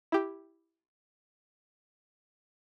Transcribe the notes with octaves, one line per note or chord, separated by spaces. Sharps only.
E4 G4